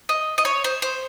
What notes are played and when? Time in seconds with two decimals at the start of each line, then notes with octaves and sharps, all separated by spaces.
0.09 D#5
0.38 D#5
0.45 C#5
0.64 C5
0.82 C5